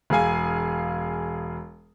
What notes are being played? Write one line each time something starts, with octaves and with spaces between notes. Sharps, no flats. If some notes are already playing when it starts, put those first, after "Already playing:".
E1 G#4 F5 G#5